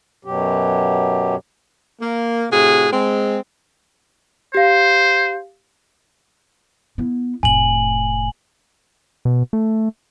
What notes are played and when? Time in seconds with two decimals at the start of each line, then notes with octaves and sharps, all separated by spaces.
0.25 F#2 B2 F#3 G4
2.01 A#3
2.51 A2 C3 F#4 G#4
2.93 G#3 C4
4.55 G4 C5 F5
6.98 B3 E4
7.43 F1 A2 G#5 F#7
9.25 B2
9.53 A3